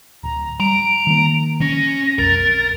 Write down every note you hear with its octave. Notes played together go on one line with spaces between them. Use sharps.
D1 A#5
G3 A#5 D7
D#3 A#3
C#4 A#6
B1 F2 A#4 A6